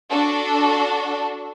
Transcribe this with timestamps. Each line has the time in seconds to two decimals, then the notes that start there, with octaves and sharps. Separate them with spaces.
0.11 D4 F#4 A4